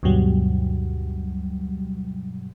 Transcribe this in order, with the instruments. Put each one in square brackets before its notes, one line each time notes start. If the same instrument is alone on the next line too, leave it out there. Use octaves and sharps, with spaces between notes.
[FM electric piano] D2 G2 B2 F#3 G3